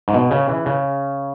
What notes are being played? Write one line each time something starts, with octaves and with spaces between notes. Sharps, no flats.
G#2
B2
C#3
E3
C#3